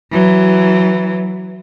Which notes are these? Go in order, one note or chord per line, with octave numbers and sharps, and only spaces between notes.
E3 F#3